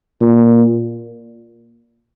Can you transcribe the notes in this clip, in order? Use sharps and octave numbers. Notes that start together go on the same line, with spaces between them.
A#2